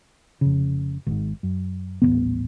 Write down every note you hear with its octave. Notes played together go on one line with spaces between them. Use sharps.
F1 C#3
G#1 G#2
F#2
D#1 A1 A2 B3